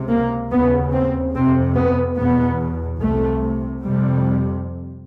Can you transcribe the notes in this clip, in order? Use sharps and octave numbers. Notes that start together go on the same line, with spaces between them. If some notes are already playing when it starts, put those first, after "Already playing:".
Already playing: C#2 C3
A#3
D#2 C#3 B3
C4
F2 C3 C4
B3
E2 B2 B3
C2 C3 A3
F2 C3 G3